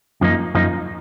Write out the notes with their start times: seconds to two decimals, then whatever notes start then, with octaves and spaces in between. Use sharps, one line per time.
0.21 F#2 F3 A#3 D#4
0.55 F#2 F3 A#3 D#4